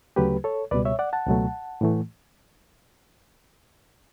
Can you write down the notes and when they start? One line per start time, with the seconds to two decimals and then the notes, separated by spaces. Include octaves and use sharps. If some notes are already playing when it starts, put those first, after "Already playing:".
0.16 D2 C#3 F#3 A3 G4 B4
0.44 A4 C#5
0.71 C#2 B2 G3 B4 D5
0.85 C#5 E5
0.99 D5 F#5
1.13 F#5 A5
1.27 C#2 B2 F#3 A3
1.81 A2 E3 A3